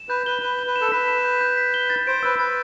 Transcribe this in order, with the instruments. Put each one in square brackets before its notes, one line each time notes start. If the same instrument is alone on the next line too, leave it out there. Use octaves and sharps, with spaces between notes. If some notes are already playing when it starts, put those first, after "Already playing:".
Already playing: [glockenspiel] E7
[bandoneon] B4 [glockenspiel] G6
[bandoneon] B4 [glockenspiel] G7
[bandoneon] B4 [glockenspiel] G7
[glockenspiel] G7
[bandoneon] B4
[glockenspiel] E7
[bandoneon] A4
[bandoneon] B4 [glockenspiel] B6
[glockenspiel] E7
G6
G6
B6
G7
A6
[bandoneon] C5 [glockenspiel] D7
[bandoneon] B4 [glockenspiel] E6
[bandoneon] B4 [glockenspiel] A6